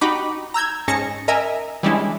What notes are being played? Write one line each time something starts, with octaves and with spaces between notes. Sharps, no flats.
D#4 F#4 G4 B5 D6
A#5 E6 G6 G#6
G#2 C#4 G#4 A5 A#6 C#7
A#4 D#5 E5 G#5 A#5
E3 G3 G#3 C#4 D4 E4